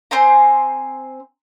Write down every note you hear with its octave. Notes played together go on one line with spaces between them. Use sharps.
C4 C5 G#5 A#5